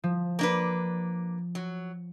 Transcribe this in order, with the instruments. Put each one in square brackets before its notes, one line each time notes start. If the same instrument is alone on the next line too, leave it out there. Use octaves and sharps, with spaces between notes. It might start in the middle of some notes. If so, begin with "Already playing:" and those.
[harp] F3
[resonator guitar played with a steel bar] A#3 D4 B4
F#3